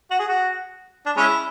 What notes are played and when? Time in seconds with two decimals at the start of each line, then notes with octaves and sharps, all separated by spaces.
0.10 F#4
0.19 G#4
0.28 F#4
1.06 D4
1.17 G#3 C#4 E4